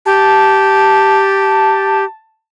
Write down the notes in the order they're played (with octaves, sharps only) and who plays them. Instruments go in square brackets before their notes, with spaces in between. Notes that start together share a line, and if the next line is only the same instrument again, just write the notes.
[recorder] G4 [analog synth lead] A5